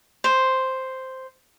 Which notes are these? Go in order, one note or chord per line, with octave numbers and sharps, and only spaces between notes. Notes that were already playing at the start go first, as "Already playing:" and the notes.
C5